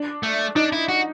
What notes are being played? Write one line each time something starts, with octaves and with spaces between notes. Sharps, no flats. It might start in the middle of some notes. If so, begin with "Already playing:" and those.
Already playing: D4
A3
D4 D#4
E4
F#4